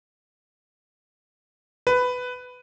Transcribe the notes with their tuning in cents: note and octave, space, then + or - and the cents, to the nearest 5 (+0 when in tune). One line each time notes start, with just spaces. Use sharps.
B4 +10